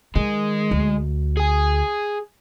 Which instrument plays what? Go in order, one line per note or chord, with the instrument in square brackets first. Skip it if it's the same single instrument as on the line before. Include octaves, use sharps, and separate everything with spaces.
[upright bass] D#3 [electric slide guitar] G#3
[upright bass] D2
[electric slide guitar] G#4 G#5